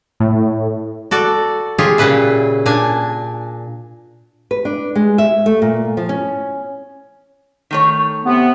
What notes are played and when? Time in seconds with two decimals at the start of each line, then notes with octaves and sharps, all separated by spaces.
0.20 A2
1.11 F#4 A4 D5
1.78 F4 G4 G#4 C#5
1.98 A#2 C#3 C#4 B4 E5
2.66 A#2 D4 G#5
4.51 B4
4.65 D4
4.95 G#3
5.18 E5
5.46 A3
5.62 A#2
5.97 F3
6.09 C#4
7.71 D#3 A3 C#5
8.25 C3 B3